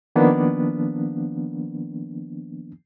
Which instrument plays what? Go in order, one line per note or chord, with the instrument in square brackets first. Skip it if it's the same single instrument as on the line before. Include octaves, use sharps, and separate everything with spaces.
[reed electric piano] D#3 F3 A#3 B3 D4